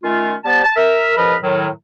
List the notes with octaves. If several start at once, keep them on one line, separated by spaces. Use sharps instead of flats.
D#3 A3 C#4 F4
G3 B3 C5 A5
A5
A#4 E5
C#2 F3 A#4 B4 D#5 B5
A2 D#3 F#3